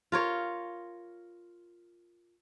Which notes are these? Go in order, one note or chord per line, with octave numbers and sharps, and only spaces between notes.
F4 A#4 C#5